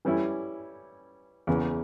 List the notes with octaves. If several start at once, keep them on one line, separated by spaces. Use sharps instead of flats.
E3 G3 C#4 E4
E2 C#3 E3